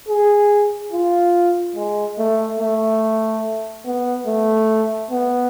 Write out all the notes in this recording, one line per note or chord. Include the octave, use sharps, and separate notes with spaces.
G#4
F4
G#3
A3
A3
B3
A3
B3